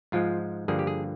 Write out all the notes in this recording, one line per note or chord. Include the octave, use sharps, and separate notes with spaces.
G#2 F3 G#3 F4
G2 D3 F3 A#3 G#4
G4
G#4